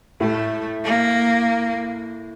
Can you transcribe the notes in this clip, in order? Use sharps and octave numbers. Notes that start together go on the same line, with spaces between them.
A2 A3
A#3